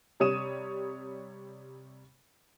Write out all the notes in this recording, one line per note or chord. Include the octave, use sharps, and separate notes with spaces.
C3 G3 C#5 D#6 D#7 E7